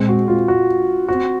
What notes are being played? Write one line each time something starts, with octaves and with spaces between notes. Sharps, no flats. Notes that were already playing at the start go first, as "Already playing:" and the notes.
Already playing: A#2 G#3 C4
F#4
F4
F#4
C4 F#4